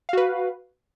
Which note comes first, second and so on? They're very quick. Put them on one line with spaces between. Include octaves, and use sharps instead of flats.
F5 F#4 B4